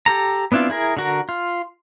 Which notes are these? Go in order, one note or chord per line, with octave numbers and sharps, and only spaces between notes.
G4 A4 A#5
B3 C4 D4 E4 F4
E4 G#4 A#4
D3 F#4 A#4
F4